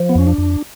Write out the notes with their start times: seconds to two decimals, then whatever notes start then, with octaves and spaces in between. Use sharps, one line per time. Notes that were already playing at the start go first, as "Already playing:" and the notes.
Already playing: F3
0.09 B3
0.15 F2 C#4
0.27 D4
0.38 F2